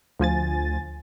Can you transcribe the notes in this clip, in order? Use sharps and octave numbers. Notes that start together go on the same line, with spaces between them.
D2 F3 G#5 A6